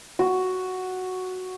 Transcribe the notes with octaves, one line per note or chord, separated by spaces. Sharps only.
F#4